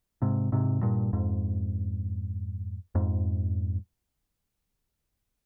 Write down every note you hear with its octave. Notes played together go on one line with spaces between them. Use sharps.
G#2 C3
G#2 C3
G2 A#2
F2 G#2
F2 G#2